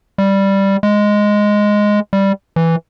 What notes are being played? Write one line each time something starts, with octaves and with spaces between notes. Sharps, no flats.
G3
G#3
G3
E3